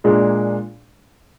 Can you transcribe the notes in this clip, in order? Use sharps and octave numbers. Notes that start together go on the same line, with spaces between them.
A#2 G#3 D4 G#4